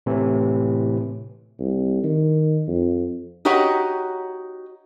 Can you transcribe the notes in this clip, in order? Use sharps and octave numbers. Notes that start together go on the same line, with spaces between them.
A2 C3 E3
C2
D#3
F2
D#4 F#4 G4 C#5 D#5 F#5